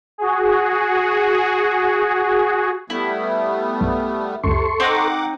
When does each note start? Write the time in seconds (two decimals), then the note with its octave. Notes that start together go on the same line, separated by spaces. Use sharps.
0.18 F#4 G#4
2.90 G3 A3 B3 E4
3.81 B1 G2
4.44 C#2 F#2 C3 A4 C6 C#6
4.80 C4 D#4 F#5 D6